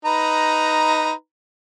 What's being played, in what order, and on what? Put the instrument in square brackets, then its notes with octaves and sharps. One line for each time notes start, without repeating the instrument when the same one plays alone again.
[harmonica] D#4 B4 A#5